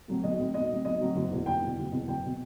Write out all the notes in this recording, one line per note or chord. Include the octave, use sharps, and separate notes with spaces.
A2 F#3 C4
B1 D#5
A2 F#3 C4
B1 D#5
A2 F#3 C4
B1 D#5
A2 F#3 C4
F#1
E2 B2
F#1 G5
E2 B2
F#1
E2 B2
F#1 G5
B2